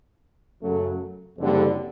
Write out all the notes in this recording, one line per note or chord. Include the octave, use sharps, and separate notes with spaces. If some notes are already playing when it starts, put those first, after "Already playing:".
F#2 C#3 F#3 A3
F#1 F2 D3 G3